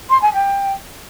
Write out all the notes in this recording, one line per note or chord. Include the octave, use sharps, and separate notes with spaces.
C6
G#5
G5